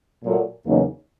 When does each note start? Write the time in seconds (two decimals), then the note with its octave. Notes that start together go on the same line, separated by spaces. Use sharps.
0.23 A#2 F#3 A3
0.66 E2 C#3 F#3 A#3 D#4